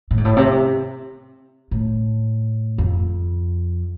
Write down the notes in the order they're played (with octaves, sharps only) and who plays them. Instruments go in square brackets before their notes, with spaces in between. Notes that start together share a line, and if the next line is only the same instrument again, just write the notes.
[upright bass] A2
G#2
A2
C3
A2
F2